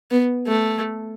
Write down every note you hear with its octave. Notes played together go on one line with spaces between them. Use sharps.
B3
A3